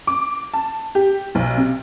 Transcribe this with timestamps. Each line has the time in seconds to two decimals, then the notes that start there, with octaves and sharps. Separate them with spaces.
0.07 D6
0.54 A5
0.95 G4
1.35 B1
1.57 C3